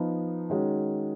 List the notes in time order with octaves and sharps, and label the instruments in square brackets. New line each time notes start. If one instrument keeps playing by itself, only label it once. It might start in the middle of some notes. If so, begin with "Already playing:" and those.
Already playing: [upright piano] F3 B3 D#4
D#3 G#3 C#4 F#4